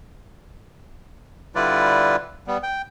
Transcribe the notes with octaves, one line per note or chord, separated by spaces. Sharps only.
D3 G3 E4 F4 B4 D5
G3 B3
G5